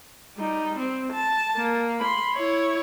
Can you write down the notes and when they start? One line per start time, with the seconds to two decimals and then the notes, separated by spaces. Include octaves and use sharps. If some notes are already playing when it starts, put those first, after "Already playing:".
0.37 G3 D#4
0.78 C4
1.13 A5
1.56 A#3
2.00 B5 C6
2.34 E4 C#5